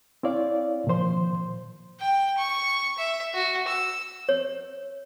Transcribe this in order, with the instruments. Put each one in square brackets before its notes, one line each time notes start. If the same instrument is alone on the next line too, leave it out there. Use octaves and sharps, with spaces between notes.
[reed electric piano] C4 E4 C#5 D5 F5
A#2 D#3 F3 C5 C6
[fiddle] G5
C#6
E5
F#4
E6
[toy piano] C#5